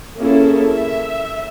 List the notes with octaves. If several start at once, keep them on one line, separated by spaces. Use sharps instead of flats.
A#3 C#4 E4 G#4 A4
E5